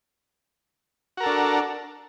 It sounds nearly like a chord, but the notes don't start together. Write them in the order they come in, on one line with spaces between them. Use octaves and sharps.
F#4 A#4 A4 D4